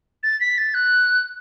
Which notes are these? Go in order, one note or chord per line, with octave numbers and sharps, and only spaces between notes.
A6
B6
A6
F#6